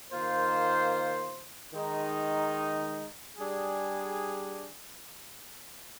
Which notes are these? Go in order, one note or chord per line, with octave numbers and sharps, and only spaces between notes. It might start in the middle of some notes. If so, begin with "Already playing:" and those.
D#3 A#3 F4 C5
D#3 G#3 D#4
G3 D4 G#4